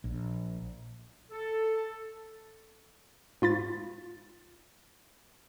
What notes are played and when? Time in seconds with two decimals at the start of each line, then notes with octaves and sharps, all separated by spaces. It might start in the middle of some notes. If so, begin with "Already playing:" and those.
0.04 A#1
1.31 A4
3.42 G#2 F4 B5 A6